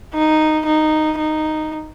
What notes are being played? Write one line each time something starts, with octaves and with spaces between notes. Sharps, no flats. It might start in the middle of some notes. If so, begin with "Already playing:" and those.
D#4
D#4
D#4